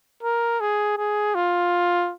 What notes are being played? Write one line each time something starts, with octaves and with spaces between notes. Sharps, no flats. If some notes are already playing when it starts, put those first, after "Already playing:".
A#4
G#4
G#4
F4